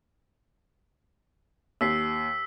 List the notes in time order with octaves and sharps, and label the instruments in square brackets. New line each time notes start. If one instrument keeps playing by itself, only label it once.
[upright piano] D#2 [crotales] E6 B6 C7